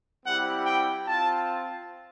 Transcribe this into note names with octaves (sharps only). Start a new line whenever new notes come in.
G3 C4 E4 G4 F#5
G5
C4 F4 A5